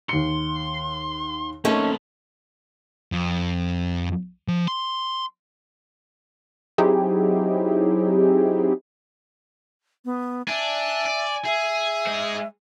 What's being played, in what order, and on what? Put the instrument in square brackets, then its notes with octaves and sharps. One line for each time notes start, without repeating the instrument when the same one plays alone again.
[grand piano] D#2 C#7 [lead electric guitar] C6
[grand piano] A3 [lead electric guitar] A#3 C4 [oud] C#4 D#4 A4
[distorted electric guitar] F2
F3
C6
[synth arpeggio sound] F#3 C4 D#4 E4 G4 G#4
[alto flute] B3
[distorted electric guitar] D4 [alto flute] E5 [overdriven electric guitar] G#5
[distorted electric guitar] D5
[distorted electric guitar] G#4 [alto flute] E5
[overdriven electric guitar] G#3 C5